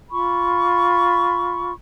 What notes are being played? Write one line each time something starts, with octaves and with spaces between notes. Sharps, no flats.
F4 B5 C#6